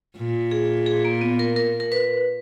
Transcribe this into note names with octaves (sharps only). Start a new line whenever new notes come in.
A#2
G#4
G#4
A#3
B3
A#4
A#4
A#4
B4